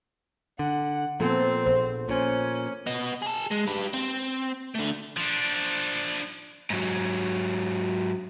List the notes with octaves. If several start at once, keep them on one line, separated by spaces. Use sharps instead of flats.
D3 F#5
A#2 F3 B3 C4 A4
A#1 C5
A#2 C#4 C5
B3 D#5
G#4 A5
G#3
G4 B4
C4
D3 A3
F3 D4
G#2 F#3